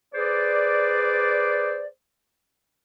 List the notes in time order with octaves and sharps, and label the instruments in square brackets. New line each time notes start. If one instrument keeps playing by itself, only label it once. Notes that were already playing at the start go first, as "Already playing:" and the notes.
[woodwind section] G#4 B4 C5 D5